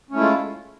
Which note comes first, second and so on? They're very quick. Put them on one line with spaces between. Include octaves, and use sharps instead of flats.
C#4 A3 E4 G#3 F4